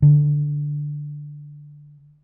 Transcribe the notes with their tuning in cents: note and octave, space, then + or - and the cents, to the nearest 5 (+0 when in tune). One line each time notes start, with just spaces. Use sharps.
D3 +0